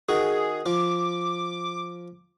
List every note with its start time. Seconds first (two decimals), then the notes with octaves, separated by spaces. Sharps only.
0.09 D#3 F#4 G#4
0.66 F3 D6